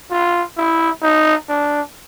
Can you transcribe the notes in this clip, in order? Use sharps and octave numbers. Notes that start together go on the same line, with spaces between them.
F4
E4
D#4
D4